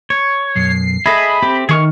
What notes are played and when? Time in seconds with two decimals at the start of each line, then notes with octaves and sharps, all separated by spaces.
0.10 C#5
0.56 B1 F#2 C7
1.06 G#4 A4 D#5 E5 B5
1.42 C4 G4
1.69 D#3 G#4 C#6 F6